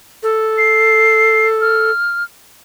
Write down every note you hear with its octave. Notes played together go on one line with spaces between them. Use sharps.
A4
C7
F6